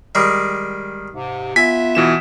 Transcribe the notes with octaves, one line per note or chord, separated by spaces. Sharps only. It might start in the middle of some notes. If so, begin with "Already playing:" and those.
D#3 G3 G#3
G#2 C3
B3 F4 E5 G#5 B6
B2 E3 E7